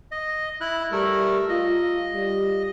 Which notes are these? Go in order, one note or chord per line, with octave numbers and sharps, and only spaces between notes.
D#5
E4 F#6
G3 A3 A4 A#4
F4 D#5
G3